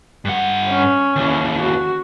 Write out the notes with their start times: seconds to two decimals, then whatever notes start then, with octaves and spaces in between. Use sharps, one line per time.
0.25 G2 F#5
0.69 C#4
1.16 D#2 E3
1.59 F#4